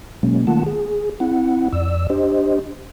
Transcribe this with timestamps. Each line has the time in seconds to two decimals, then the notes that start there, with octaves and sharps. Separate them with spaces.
0.23 B2 F#3 G#3 A#3 C#4
0.47 D#3 A3 A#3 F4 F#5 A5
0.66 G#4
1.20 C4 E4 F#5
1.73 F2 D5 E6
2.10 D4 G4 C5 D#5